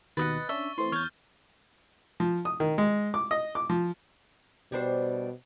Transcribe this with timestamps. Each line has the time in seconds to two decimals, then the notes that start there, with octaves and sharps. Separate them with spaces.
0.17 D#2 B2 B4 D#5 F#5 A6
0.49 C#4 D4 E5 C#6 G7
0.78 E3 A3 C4 C6
0.92 E2 C#5 F6 G6
2.20 F3
2.45 D#6
2.60 D#3
2.78 G#3
3.14 D6
3.31 D#5
3.55 D6
3.70 F3
4.72 B2 G3 D4 C5